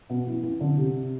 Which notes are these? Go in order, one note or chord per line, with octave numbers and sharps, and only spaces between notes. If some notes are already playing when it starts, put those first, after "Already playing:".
B2
E3
E3
D3
C3